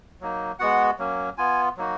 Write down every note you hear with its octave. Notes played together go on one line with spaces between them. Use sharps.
F#3 A#3 D#4
G#3 B3 F#4 F#5
F#3 A#3 C#4
B3 F4 G#5
F#3 A#3 D#4 F#4